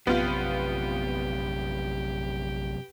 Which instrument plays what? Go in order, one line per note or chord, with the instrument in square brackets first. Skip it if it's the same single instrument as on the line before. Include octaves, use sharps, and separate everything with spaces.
[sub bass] A#1 [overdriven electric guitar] F#2 C3 [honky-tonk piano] B3 F4 [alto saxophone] G4